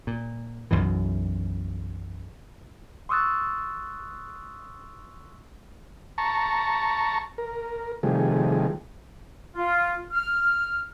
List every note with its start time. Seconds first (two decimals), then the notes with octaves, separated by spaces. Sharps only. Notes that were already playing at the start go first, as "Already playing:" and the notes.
0.07 A#2
0.71 B1 F#2 B2 E3
3.09 C6 C#6 D#6 E6 F#6 A6
6.18 A5 A#5 C#6
7.38 A#4
8.03 C3 D#3 F3 G3 A3 G#4
9.56 F4
10.12 F6